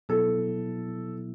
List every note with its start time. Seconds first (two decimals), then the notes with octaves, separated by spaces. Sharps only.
0.09 B2 F#3 B3 E4 A4